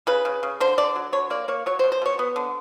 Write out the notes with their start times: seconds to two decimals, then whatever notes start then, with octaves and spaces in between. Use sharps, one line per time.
0.07 C#3 B4
0.25 C#3
0.43 C#3
0.60 D3 C5
0.78 D3 D5
0.96 F#3
1.13 D3 C#5
1.30 A#3 D5
1.48 A#3 C#5
1.66 F#3 C#5
1.79 C5
1.84 B2
1.92 C5
2.02 B2 C#5
2.19 B3
2.36 D3